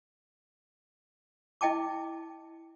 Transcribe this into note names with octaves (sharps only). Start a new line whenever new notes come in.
E4 D#5 G5 A5 D6